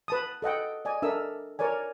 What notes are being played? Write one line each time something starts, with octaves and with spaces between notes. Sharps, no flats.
B4 A5 D#6
A4 D#5 F#5 G5
D5 D#5 G#5
D4 A4 A#4 E5 E6
A#4 C#5 D5 G#5